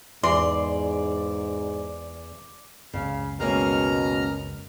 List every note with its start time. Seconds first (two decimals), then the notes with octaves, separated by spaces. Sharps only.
0.23 E2 G#2 D5 C6
2.93 F#1 C#2 C#3 F5
3.40 B2 G#3 A#3 C#4 A#5 F6